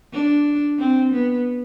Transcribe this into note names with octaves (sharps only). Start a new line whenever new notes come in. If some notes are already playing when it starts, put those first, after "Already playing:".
D4
C4
B3